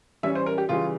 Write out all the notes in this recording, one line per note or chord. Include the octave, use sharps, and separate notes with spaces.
E3 G3 C#4 E5
C5
A#4
G4
C#3 E3 G3 F4